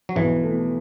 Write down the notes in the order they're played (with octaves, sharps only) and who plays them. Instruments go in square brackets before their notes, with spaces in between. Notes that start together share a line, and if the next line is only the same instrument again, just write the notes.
[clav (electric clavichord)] F#3
[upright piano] B1 [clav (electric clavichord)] E3
[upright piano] B2 A3